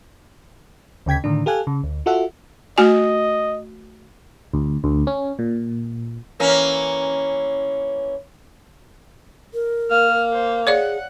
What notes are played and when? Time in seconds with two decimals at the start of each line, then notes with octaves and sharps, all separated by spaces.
1.06 D2 C#3 G5 G#6 B6
1.24 A2 D3 D#3 D4
1.46 G4 A4 F5 G#5 F#6
1.67 C#3
1.83 D2
2.06 F4 F#4 A4 E5 F#5
2.78 A3 F#4 D#5 G#5
4.54 D2
4.84 D2
5.07 C#4
5.39 A#2
6.40 E3 A#3 C#4
9.54 A#4
9.91 A#3 F6
10.33 C5
10.67 G#4 C#5 D5 F5 F#5